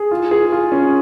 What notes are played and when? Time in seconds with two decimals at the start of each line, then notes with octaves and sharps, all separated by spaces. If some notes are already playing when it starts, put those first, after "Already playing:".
Already playing: G#4
0.11 F4
0.31 G#4
0.52 F4
0.72 C#4